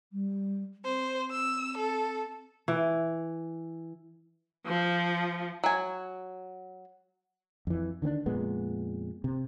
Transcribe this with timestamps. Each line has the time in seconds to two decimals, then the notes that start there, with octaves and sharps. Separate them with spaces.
0.12 G3
0.84 C4 C5
1.31 E6
1.77 A4
2.68 E3
4.67 F3
5.64 F#3 G#5
7.67 F2 E3
8.02 D3 D#3 C4 D4
8.26 F2 A#2 G#3 B3
9.24 C3